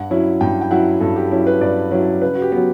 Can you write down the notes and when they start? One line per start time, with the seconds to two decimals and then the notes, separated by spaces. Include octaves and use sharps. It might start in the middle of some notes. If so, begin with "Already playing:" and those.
Already playing: G2 F#5
0.10 F#3 C#4 E4
0.41 G2 G5
0.61 G5
0.70 F#3 C#4 E4 F#5
1.01 G2 A4
1.16 G4
1.31 F#3 C#4 E4
1.47 B4
1.61 G2 D5
1.91 F#3 C#4 E4
2.22 C#3 B4
2.35 F#4
2.42 G4
2.52 F#3 B3